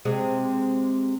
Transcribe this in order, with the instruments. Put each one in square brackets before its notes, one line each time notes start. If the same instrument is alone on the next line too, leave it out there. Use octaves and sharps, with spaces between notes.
[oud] C3 G#3